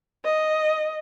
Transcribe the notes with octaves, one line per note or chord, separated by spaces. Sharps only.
D#5